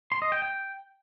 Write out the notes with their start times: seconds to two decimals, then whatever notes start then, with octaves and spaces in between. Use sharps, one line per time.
0.12 C6
0.22 D#5
0.32 G5
0.42 G5